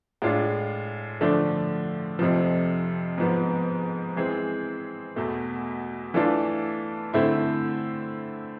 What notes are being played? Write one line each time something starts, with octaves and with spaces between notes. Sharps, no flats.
A2 G#3 D4 F4
D3 F3 A3 D4
F2 C3 F3
G#2 F3 B3
E3 G#3 C4 G#4
E2 B2 A3
E3 A3 D4 F4 A4
D3 A3 C4 E4